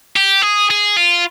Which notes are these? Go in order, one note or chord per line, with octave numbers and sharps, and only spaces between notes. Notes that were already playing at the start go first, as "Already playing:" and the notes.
G4
G#4
G#4
F4